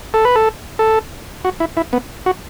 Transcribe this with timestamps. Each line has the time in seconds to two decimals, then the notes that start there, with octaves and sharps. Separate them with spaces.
0.14 A4
0.25 B4
0.36 A4
0.79 A4
1.45 F#4
1.60 E4
1.77 E4
1.93 B3
2.26 F#4